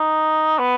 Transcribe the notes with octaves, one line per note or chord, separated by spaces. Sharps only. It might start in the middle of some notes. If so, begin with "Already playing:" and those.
Already playing: D#4
B3